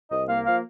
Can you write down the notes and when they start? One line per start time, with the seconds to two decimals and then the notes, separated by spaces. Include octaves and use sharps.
0.10 C2 D#5
0.28 A#3 F5
0.46 F3 F5